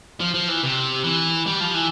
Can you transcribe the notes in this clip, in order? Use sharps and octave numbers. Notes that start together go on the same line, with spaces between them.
F3
F3
E3
C3
E3
G3
F3
E3